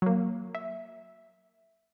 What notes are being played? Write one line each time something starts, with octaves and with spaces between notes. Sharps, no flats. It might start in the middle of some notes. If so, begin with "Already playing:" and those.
F#3 A#3
E5